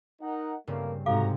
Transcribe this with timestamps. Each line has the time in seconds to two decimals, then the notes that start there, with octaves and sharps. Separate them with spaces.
0.21 D#4 A#4 F#5
0.67 G2 C#3 A3 A#3 C4 A#4
1.06 G#2 C3 A3 F#4 A4 F5 A#5 D6